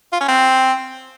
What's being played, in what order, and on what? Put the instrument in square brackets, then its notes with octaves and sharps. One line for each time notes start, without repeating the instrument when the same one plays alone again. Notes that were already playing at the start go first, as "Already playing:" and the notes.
[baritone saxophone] F4
C#4
C4